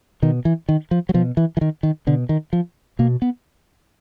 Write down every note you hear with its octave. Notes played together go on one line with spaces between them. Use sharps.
B2 D#3
E3
D#3
F3
F#3
B2 F3
E3
E3
D#3
D#3
B2 D3
D#3
F3
B2 A#3
B3